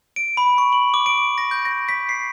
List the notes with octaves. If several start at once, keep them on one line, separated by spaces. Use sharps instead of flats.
D7
B5
C#6
F#7
D6
D7
A#6
G6
A#6
B6
C7